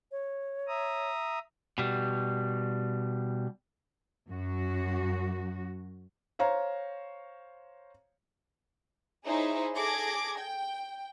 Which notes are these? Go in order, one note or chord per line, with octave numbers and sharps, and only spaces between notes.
C#5
E5 A#5 D#6
B2 G3
F#2 F#4
C5 C#5 F5 A#5
D#4 E4 G#4 C5 C#5 E5
G#4 A4 D6 G#6 A#6
G5